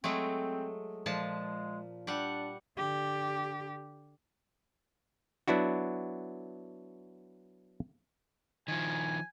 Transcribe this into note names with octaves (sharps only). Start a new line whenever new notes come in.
F#3 G#3 A3 C4
A#2 F3 G#3 A5
G3 D4 F#5
D3 G4
F#3 B3 D4 E4 F#4
D#3 F3 G#5